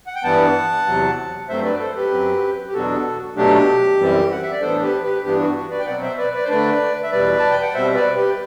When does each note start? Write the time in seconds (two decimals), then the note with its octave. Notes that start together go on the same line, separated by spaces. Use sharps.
0.07 F#5
0.15 G5
0.24 G2 E3 G3 B3 F#5 A5
0.86 E2 C3 F#3
1.49 G2 F#3 A3 C4 C5 E5
1.64 B4 D5
1.80 A4 C5
1.96 G4 B4
2.11 F#2 F#3 C4
2.68 G4
2.74 E2 B2 F#3 B3 D4 F#4 A4
3.36 B2 F#3 A3 D4 G4
3.99 F#2 E3 G3 C4
4.32 F#5
4.42 E5
4.52 D5
4.61 A2 E3 B3 D4 A4 C5
4.82 G4 B4
5.03 G4 B4
5.24 G2 E3 B3 D4 G4
5.40 F#4
5.55 F#4
5.71 B4 D5
5.79 G5
5.86 B2 F#3 C4 D5 F#5
6.02 C5 E5
6.18 B4 D5
6.33 B4 D5
6.44 C5
6.49 D3 A3 D4 B4 D5
7.03 E5
7.12 E2 B2 G3 B4 D5
7.39 A5
7.51 G5
7.62 F#5
7.74 B2 G3 C4 C5 E5
7.95 B4 D5
8.16 G4 B4